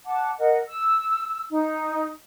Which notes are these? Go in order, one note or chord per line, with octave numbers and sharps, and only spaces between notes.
F#5 A5 D6
A#4 D#5 F#5
E6
D#4